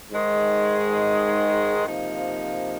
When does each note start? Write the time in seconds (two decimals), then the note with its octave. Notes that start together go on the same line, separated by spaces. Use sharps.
0.12 G#2 D#3 G#3
1.87 C3 F3 A#3 D#4